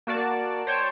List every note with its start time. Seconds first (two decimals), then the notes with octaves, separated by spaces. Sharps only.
0.07 A#3 F#4 D5 A5
0.67 C5 C#5 G5 A5